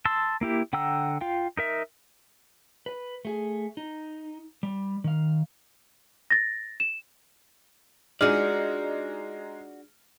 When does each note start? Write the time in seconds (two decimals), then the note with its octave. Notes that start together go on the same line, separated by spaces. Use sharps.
0.05 A5 C6 E6
0.41 A#3 E4 G4
0.73 D3 F#5 G5 A#5 E6
1.21 F4 F5 G5
1.57 D#4 A#4 E5
2.86 B4
3.25 A3 G#4
3.77 D#4
4.63 G3
5.04 D#3 F5
6.30 A6 A#6
6.80 E7
8.21 G#3 D4 D#4 F4 F#4 G#4 D5 F6